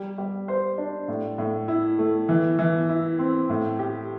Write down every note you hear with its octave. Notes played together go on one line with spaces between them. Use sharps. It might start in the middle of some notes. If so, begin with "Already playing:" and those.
Already playing: G3
G3
C5
D4
A2
A2
E4
A3
E3
E3
E4
C4
A2
G4